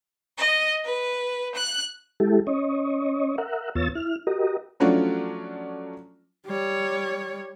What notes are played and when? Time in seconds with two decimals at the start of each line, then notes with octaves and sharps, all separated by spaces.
0.38 D#5
0.85 B4
1.54 F#6
2.20 G#3 E4 G4 A4
2.47 C#4 C#5 D#5
3.38 A#4 E5 F#5
3.75 E2 B3 F4 C#5 E6 A6
3.95 E4 F6
4.27 F#4 G4 A#4 D#5
4.80 F3 F#3 A3 C#4 D4 F4
6.47 G3 C#5